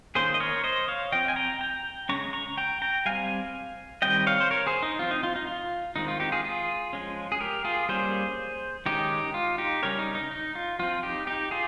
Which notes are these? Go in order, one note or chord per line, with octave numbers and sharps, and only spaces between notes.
D#3 A#3 C#4 G#4 C5
D#5
A#4 C#5
C5 D#5
C#5 F5
F3 C4 D#5 G5
G#5
G5 A#5
G5 A#5
C#3 G#3 C#4 A#5 C#6
A#5 C#6
G5 A#5
G5 A#5
G3 C4 F5 G#5
D#3 G3 C4 D#5 G5
C#5 F5
C5
A#4 C#5
G#4 C5
D#4
F3 C4 F4
D#4
F4
D#4
F4
D#3 G#3 C4 D#4
F4
D#4 G4
F4 G#4
F4 G#4
F3 G#3 C#4
G#4
G4 A#4
F4 G#4
G3 A#3 C#4 G#4 C5
D#3 G#3 C#4 D#4 G4
F4
D#4 G4
C#3 G3 C#4 A#4 C#5
D#4
D#4
D#4
F4
F3 C4 F4
D#4 G4
D#4 G4
F4 G#4